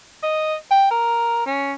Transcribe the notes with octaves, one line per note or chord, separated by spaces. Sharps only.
D#5
G5
A#4
C#4